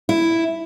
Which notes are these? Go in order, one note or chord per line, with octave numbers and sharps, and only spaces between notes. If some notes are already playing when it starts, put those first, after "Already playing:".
E4